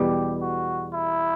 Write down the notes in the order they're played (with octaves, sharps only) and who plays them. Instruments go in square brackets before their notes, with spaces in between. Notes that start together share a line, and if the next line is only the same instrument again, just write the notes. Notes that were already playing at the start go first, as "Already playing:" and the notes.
Already playing: [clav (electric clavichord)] E2 B2 G3 [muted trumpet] G4
[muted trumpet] F#4
E4